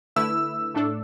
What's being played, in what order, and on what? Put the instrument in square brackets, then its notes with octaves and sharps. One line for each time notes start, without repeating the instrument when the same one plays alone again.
[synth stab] D3 A3 E4 B4 [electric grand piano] E6
[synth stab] A2 A3 D4 A4